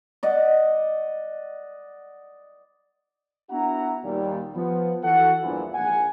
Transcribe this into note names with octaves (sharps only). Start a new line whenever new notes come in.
D5 D#5 F#5
B3 D4 E4 F#4 F#5 A#5
D#2 A#2 G3
F3 B3
E3 F#4 A4 F#5
E2 G2 A#2 D3 E3 F3
A#1 G#2 F#5 G#5